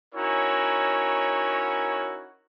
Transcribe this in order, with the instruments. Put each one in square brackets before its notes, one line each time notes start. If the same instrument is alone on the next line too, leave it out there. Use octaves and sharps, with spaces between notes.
[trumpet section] C#4 D#4 E4 F#4 A#4 C#5